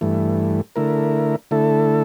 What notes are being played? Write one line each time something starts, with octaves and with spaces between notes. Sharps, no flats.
G2 E3 A3
D3 A3 E4 A#4
D3 A3 E4 A4